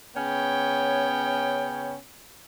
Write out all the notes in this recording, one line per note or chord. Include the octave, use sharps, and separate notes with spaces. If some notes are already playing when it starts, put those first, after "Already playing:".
C#3 B3 C#4 C#5 G5